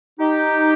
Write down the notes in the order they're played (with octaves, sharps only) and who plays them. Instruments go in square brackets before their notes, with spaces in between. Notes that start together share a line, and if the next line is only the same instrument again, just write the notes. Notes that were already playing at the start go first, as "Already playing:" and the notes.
[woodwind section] D#4 G4